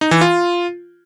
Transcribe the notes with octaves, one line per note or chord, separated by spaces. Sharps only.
D#4
E3
F4